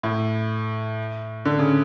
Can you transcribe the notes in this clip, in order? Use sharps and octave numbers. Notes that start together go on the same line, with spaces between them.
A2
D3
C#3